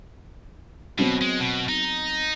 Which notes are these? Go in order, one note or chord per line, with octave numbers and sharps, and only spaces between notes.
B2 F#3 B3 C4
G#3
B2
D#4